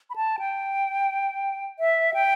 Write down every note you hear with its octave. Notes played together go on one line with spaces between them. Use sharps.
B5
A5
G5
E5
G5